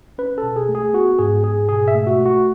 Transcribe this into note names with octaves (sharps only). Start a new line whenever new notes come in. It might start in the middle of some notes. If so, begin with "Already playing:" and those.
C#4 B4
A4
B2
G#4
A3
G#4
B3 F#4
G#2 G#4
G#2 G#4
B2 G#4
E5
A3
F#4
A3
F#4